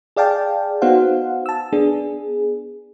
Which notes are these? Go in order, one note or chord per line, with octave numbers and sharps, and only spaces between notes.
G#4 D5 F5 G5 A5
B3 D#4 F#4 C5 F5 F#5
A5 E6
B3 D4 G#4